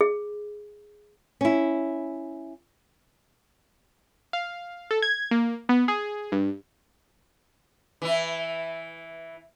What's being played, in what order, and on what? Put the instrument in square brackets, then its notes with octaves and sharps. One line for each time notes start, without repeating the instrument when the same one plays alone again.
[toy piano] G#4
[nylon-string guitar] C#4 E4
[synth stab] F5
A4
G#6
A#3
B3
G#4
G2
[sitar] E3 E4